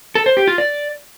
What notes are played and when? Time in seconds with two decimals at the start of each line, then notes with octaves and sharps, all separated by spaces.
0.15 A4
0.26 C5
0.37 G4
0.48 F4
0.58 D5